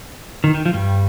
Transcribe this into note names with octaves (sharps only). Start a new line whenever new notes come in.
D#3
D#3
F3
G2 G3